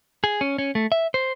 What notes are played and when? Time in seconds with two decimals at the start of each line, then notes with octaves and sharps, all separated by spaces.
0.24 G#4
0.41 C#4
0.58 C#4
0.75 A3
0.92 E5
1.14 C5